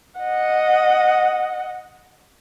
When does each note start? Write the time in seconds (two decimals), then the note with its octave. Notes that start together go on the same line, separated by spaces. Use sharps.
0.21 D#5 F#5